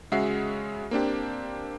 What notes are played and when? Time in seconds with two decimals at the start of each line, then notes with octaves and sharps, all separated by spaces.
0.12 C#3 G#3 F#4 E5 F#5 C7
0.91 A#3 C4 D4 G4